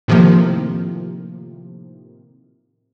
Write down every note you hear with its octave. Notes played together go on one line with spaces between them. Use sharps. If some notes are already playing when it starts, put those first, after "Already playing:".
A2 C3 D#3 F3 A#3